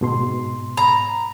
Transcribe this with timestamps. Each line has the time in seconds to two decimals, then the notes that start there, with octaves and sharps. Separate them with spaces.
0.01 G#2 B2 C6
0.77 A#5 B5